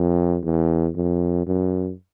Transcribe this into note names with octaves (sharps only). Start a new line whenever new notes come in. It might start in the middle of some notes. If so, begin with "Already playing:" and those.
Already playing: F2
E2
F2
F#2